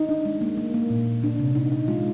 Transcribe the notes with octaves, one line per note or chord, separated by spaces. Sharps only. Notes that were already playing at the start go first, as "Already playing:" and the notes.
Already playing: D#4
D4
G#3
A#3
A#3
A#3
A#2
A#2
D4
C3
D#4
D#4
G#3 F4